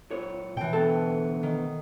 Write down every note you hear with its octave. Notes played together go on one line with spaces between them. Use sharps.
F#2 A#2 C#5
B2 E3 G5
D2 B3 A4 A5
D#3